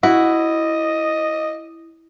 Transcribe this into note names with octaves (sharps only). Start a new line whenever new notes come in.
E4 F#4 D#5